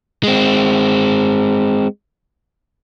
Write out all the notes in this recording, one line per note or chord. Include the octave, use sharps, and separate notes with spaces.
G#3 C4